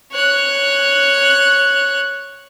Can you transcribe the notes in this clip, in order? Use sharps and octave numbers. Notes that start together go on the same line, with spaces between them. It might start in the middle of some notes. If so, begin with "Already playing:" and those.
C#5 F#6